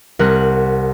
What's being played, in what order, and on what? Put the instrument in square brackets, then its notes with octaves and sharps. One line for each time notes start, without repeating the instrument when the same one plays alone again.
[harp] C2 A#4 F#5 F#6